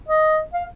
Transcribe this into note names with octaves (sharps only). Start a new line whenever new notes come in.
D#5
F5